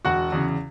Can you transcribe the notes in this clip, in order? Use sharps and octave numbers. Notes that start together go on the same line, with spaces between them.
E1 F#4 F#5
E2 C#3